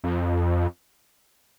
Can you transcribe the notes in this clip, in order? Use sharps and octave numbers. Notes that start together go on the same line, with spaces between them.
F2